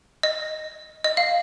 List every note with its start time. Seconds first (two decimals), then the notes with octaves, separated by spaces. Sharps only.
0.23 D#5
1.04 D#5
1.17 F5